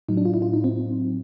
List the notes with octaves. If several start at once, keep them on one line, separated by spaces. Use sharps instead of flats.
A2 F#3 D#4
D4
F4
E4
F4
D#4
C4